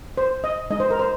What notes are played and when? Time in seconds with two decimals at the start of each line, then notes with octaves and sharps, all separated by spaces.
0.17 C5
0.44 D#5
0.70 G#3 D#4 D#5
0.80 C5
0.91 A#4
0.99 C5